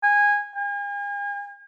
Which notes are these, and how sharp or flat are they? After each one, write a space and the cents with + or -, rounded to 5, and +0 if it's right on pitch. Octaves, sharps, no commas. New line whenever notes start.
G#5 -15
G#5 -45